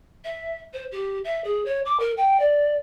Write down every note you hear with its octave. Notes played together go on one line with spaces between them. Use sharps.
E5
C5
G4
E5
G#4
C#5
D6
A#4
G5
D5